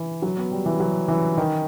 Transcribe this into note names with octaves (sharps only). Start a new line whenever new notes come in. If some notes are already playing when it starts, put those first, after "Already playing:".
Already playing: E3
F#3
B3
G3
E3
F#3
E3
D#3